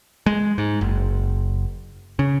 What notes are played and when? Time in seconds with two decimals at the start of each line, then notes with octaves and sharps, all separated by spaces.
0.26 G#3
0.58 G#2
0.81 F#1
2.19 C#3